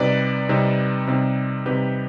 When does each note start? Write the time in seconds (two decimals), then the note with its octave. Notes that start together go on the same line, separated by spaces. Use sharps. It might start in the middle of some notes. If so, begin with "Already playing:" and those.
Already playing: C3 G3 C4 D#4 B4 D5
0.49 C3 G3 C4 D#4
1.07 C3 G3 C4 D#4
1.66 C3 G3 C4 D#4 G4 B4